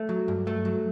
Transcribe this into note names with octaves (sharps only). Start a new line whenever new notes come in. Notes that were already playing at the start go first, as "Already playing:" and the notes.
Already playing: A3
F#3
G2
A3
F#3